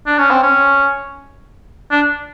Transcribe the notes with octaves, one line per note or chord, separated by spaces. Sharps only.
D4
C#4
C4
C#4
D4